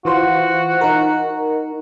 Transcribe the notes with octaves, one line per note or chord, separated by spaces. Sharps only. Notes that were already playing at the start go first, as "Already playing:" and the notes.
E3 F4 F#4 C5
D#4 A#4